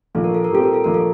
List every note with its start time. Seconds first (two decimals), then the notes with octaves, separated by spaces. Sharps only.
0.15 A#1 A4
0.24 A#4
0.34 A4
0.44 A#4
0.50 A#2 G3 C4 G4 A4
0.64 A#4
0.74 A4
0.84 A#1 A#4
0.94 A4